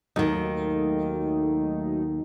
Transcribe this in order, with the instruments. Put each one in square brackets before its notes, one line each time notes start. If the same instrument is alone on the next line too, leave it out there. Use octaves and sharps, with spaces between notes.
[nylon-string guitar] D#2 D#3 [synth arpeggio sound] F#3 A3 D#4